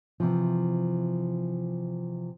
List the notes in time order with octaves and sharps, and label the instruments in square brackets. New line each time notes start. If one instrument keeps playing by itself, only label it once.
[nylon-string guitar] C3 E3 F3